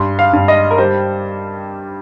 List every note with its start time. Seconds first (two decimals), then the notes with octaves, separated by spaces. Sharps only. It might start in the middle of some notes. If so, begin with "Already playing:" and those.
Already playing: G2 C6
0.19 F5
0.33 G2
0.48 D#5
0.71 A#4
0.78 G3 C5